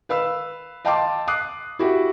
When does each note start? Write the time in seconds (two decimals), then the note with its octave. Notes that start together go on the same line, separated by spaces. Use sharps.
0.09 B4 F5 B5 E6
0.85 D#5 F5 G5 A5 C6 D6
1.28 D6 D#6 F#6 C7
1.79 E4 F#4 G4